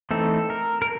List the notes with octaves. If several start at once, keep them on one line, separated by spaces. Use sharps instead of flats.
E3 A3 C4 D#4 A4
A#4
A#4